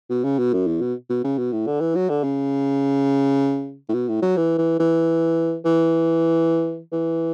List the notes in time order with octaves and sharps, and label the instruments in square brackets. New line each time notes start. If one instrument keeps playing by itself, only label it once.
[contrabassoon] B2
C#3
B2
F#2
E2
B2
B2
C#3
B2
A2
D3
E3
F#3
D3
C#3
A2
B2
A2
F#3
E3
E3
E3
E3
E3